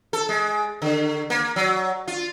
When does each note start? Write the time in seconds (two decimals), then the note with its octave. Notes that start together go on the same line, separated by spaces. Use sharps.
0.13 A4
0.29 G#3
0.82 D3
1.30 A#3
1.56 F#3
2.08 F4